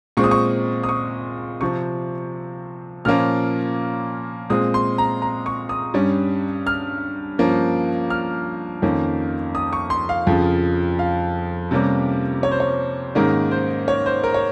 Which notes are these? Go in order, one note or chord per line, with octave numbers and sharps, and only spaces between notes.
A#2 G#3 C4 C#6
D#6
C#6
D#6
C#6
C3 F3 C4 C#6
A#2 F3 A#3 C#4 F6
A#2 G#3 C4 D#6
C6
A#5
A#5
C#6
D#6
G2 G3 C#4
F6
G2 F3 A#3 C#4
F6
F2 D#3 A#3 C#4
D#6
C#6
C6
F5
F2 C#3 F3
F5
C3 G3 A#3 C#4
C#5
C5
C#5
G#2 D#3 A#3 C#4 A#4
C5
C#5
C5
A#4
C#5